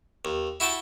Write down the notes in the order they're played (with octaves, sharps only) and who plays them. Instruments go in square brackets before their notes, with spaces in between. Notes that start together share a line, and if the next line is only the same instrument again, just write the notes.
[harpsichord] D#2
E4 F#4 G5 A5